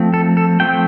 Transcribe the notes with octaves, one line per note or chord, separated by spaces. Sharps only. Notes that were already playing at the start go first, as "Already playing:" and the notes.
Already playing: F3 A3 C4
A4
A4
F3 A3 C4 G5